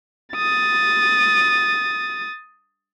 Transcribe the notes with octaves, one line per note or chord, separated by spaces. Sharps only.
D#6 A6